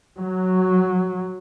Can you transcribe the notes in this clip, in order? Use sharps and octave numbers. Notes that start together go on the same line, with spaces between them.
F#3